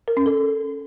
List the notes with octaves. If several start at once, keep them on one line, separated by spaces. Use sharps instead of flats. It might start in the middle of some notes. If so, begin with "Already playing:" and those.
A#4
C#4
A4